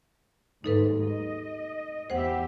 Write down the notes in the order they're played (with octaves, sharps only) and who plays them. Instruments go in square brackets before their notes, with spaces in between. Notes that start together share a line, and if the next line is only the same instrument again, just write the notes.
[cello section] D#2 G#2 F#3 [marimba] D#4 A4 B4
[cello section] D#5
[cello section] E2 G4 E5 [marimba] C5 F#5